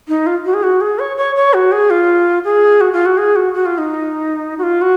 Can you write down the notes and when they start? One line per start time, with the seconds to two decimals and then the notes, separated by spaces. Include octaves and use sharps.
0.08 D#4
0.26 F4
0.45 F#4
0.54 G#4
0.63 F#4
0.81 G#4
0.99 C#5
1.17 C#5
1.36 C#5
1.54 F#4
1.72 G#4
1.90 F4
2.45 G#4
2.81 F#4
2.93 F4
3.06 F#4
3.18 G#4
3.36 F#4
3.54 F#4
3.66 F4
3.78 D#4
4.59 F#4
4.63 F4
4.82 F#4